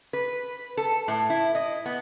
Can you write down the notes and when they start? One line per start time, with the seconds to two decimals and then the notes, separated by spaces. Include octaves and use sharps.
0.13 B4
0.77 A4
1.08 A2
1.30 E4
1.55 D#5
1.86 B3